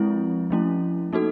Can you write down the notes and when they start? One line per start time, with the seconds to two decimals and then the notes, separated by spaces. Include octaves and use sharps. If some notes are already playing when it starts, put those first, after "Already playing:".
Already playing: F3 G#3 C4 E4
0.50 F3 A3 C#4 E4
1.13 A#3 D#4 F#4 A4